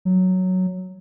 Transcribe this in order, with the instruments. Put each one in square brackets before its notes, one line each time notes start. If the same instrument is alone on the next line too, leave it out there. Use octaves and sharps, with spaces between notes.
[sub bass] F#3